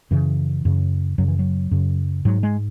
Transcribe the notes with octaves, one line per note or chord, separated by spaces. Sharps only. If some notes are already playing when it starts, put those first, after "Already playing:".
F#2 C#3 E3
F#2 C#3
F#2 C#3 F#3
E3
F#3
F#2 C#3
G#2 F#3
G#3